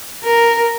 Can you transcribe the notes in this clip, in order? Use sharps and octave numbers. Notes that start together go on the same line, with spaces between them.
A#4